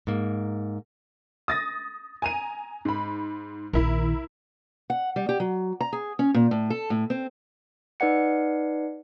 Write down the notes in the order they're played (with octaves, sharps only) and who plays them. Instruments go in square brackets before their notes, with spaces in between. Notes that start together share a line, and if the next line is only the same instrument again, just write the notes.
[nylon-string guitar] G#2 A#3
[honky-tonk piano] D#6 A6 A#6
G#5 A#5 D#7
G#2 B5
[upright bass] A#1 D#3 [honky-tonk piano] E4 A#4
[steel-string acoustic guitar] F#5
G3
G4
F#3
A#5
G#4
C#4
A#2
A2
A4
A2
C4
[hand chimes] D#4 B4 D5 F#5 C#7